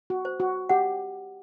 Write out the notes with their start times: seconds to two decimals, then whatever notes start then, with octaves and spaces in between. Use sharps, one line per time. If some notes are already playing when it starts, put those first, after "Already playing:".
0.10 F#4
0.25 C5
0.40 F#4
0.69 G4 F#5